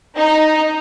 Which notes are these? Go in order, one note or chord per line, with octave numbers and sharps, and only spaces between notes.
D#4